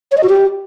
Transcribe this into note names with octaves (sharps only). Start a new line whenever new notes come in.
C#5
D#5
F#4
G4